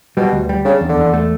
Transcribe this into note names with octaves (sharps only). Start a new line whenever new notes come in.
B2 G3
D2
G3
C#3 D4
E2
D3
E2
A3